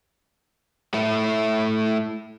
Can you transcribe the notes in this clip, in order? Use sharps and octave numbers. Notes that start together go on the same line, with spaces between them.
A3 E4